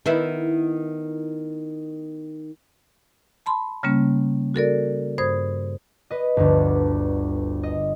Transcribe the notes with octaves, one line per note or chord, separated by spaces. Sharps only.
D#3 B3 E4
A5 B5 C6
C#3 G3 A#3 C#4
F#4 A4 A#4 D5
G2 C5 D#6 G#6
B4 D#5
G1 D2
D#5